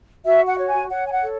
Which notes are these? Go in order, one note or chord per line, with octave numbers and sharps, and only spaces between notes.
F#4 E5
F#5
C#5
G#5
C#5 F#5
G#5
F#5
A4